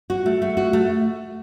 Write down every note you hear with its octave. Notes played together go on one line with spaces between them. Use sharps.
F#4
A3
A3
F#4
A3